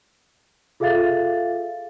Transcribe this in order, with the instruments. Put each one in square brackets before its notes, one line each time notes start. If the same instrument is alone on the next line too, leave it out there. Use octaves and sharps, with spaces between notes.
[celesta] F4 G#4 A4 E5 F5 A6